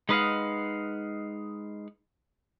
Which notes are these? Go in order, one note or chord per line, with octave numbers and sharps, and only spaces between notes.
G#3 D#4 B4 D#5 F5 F#5